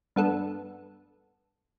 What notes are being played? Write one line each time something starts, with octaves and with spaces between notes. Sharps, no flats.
G2 B3 A4